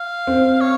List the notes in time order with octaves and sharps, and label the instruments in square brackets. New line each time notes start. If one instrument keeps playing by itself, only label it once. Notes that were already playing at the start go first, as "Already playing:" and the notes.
Already playing: [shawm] F5
[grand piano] C4
[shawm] C#5